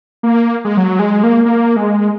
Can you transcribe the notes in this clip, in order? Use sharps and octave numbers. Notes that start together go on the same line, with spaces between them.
A#3
G#3
F#3
G#3
A#3
A#3
G#3